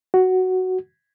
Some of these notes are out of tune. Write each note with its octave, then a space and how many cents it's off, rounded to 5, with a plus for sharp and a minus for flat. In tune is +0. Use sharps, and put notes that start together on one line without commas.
F#4 +5